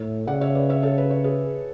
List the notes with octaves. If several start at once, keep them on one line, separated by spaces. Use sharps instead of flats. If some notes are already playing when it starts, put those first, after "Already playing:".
Already playing: A2 C#5 E5
C#3 D5 F#5
C#5 E5
B4 D5
C#5 E5
A4 C#5
B4
C#5
G#4 B4